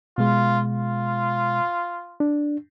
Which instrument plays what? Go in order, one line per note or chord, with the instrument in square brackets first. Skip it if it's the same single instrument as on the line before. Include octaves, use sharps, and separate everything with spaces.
[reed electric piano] B2 G#3 [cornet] F4
[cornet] F4
[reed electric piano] D4